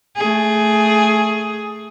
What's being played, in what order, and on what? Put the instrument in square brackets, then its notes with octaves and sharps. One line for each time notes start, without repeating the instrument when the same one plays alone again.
[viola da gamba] A3 G#4